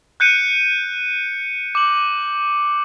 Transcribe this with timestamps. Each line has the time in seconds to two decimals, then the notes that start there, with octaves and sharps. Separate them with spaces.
0.20 F#6 G6 C#7 D#7
1.75 D6 F#7